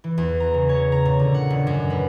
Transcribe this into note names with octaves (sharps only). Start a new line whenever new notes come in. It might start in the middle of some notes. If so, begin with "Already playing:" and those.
E3
E2
A#5
C#3
C#5
A#5
A#2
D3
F#5
D#1
F#2
B4